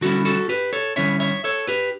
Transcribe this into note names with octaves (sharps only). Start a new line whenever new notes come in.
D3 G3 C#4 E4 F#4 A4
F#4 A4
G4 B4
A4 C#5
D3 G3 C#4 E4 C#5 E5
C#5 E5
A4 C#5
G4 B4